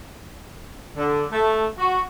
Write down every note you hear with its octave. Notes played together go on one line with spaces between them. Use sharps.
D3
A3
F#4